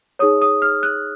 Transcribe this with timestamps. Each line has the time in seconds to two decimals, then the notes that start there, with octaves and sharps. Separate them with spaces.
0.19 D#4 G#4 C#5 D#6
0.42 D#6
0.62 F6
0.83 F#6